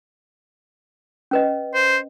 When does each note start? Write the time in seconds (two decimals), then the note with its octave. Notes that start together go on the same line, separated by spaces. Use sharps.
1.31 C#4 B4 D#5
1.75 C5